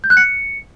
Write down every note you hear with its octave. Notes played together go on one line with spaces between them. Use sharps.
G6
F#6
C#7